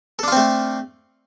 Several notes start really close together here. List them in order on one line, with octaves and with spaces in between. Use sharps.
A4 D4 F4 C4 A3